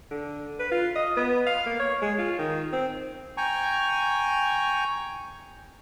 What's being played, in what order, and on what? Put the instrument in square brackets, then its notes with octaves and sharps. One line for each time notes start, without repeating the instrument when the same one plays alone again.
[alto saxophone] D3
B4
F4
D#5
B3
F5
A#3
C#5
G#3
F4
D#3
C4
[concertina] G5 G#5 A#5 C#6